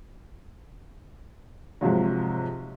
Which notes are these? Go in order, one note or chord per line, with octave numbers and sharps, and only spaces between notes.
G#2 C3 F3 F#3